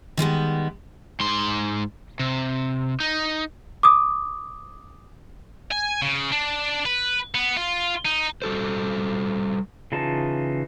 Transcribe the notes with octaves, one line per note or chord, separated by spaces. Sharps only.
D#3 G3 G#3 B3
G#2 C6
C3
D#4
D6 D#6
G#5
C#3
D4
B4
B3
F4
D#4
G3 F#4 A4 C5
C#3 E3 D#4 F4 A5